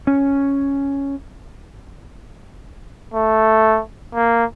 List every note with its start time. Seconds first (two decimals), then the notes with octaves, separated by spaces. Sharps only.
0.07 C#4
3.14 A3
4.14 A#3